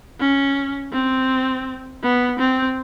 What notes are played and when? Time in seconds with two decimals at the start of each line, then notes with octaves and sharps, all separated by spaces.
0.20 C#4
0.93 C4
2.03 B3
2.39 C4